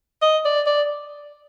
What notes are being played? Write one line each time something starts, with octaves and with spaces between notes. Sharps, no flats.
D#5
D5
D5